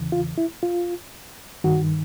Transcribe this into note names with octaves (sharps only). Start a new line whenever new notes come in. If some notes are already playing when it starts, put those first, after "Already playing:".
Already playing: E2 C#3 E3
F4
E4
F4
G2 D#3 F#4